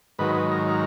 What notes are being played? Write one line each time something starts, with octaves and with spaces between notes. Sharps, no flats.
G#2 D#3 F#3 B4
B4
A#4
A#4